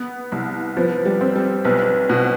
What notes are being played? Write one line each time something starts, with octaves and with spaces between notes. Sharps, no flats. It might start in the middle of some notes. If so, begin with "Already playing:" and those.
Already playing: B3
C2
F3 B3
G3
C4
G3
B1 B3
B2